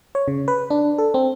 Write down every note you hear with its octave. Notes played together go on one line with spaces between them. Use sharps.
C#5
C#3
B4
D4
A4
C4